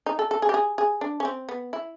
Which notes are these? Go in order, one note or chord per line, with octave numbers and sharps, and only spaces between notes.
D#4
A4
A4
G#4
G4
G#4
G#4
D4
C#4
C4
B3
E4